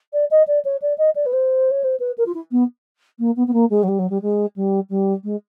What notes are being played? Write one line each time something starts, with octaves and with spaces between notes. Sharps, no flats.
D5
D#5
D5
C#5
D5
D#5
D5
B4
C5
C#5
C5
B4
A#4
F4
E4
B3
A#3
B3
B3
A#3
G#3
F#3
G3
F#3
G3
G#3
G3
G3
G#3